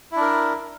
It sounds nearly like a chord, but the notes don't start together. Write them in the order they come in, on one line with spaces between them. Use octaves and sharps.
E4 D4 A#4